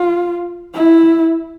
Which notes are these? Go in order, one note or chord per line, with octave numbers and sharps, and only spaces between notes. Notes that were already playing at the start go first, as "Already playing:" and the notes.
Already playing: F4
E4